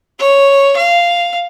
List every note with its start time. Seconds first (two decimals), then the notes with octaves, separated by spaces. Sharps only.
0.19 C#5
0.76 F5